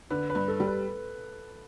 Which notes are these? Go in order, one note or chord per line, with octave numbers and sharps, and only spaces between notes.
D3 B4
B4
G2
A4
G3
B4